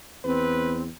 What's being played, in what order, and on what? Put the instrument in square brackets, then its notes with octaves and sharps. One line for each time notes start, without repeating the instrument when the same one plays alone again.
[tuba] E2 [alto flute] C4 [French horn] B4